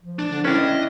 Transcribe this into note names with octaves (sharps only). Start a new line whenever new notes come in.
F3
D4
D3
C#4 D4 E4 B4 G5
D#5